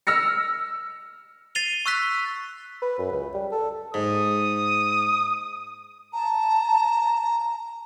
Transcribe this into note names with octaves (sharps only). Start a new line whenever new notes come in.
E6 F6 A#6 C#7
A6 C7 D#7 F7 G7
C#6 E6 F#6 B6
B4
F#2
C#2
G3
A4
G#2 D#6
A5 A#5